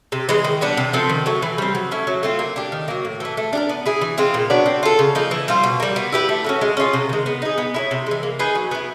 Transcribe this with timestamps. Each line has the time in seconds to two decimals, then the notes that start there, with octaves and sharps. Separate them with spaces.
0.12 C3
0.29 E3 G#3
0.44 D#3
0.61 G3 B3 D4
0.77 C3
0.93 F3 A3 C4
1.09 D#3
1.26 F#3 A3
1.42 E3
1.58 G3 C4
1.75 F#3
1.91 A3 C#4 E4
2.07 F#3
2.23 A3 C4 F4
2.39 A#3
2.56 D4 G4
2.72 D#3
2.88 F#3 A#3
3.05 A2
3.20 E3 A3
3.37 A3
3.53 D4 G4 A#4
3.69 B3
3.86 E4 G#4
4.01 E3
4.18 G#3 C4 F4
4.34 A#2
4.50 F#3 B3 D4
4.66 C4
4.83 F4 A4
4.99 C#3
5.15 F3 A#3 D#4
5.31 E3
5.48 G3 C4 F4
5.63 B2
5.80 G3 A#3
5.96 B3
6.12 E4 G4 B4
6.29 A3
6.44 C#4 F#4 A4
6.61 G#3
6.77 C#4 F4 G#4
6.93 C3
7.09 D#3 G#3
7.26 B3
7.42 D#4 G#4
7.58 B3
7.74 E4 A4 C#5
7.91 C3
8.06 E3 G#3
8.23 A#3
8.39 D#4 G#4 B4
8.55 F#3
8.71 B3 E4